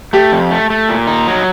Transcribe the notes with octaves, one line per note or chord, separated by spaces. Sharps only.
A3 G4
F2
A3
A3
A#2
D#4
F#3